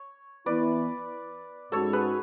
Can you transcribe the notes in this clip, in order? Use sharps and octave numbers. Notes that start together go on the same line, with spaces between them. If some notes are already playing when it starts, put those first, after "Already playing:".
Already playing: C#5
E3 B3 E4 B4 D5
G#2 G#3 C#4 F#4 A4 C#5
G#4 B4